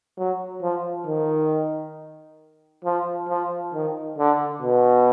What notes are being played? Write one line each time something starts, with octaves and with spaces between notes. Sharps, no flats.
F#3
F3
D#3
F3
F3
D#3
D3
B2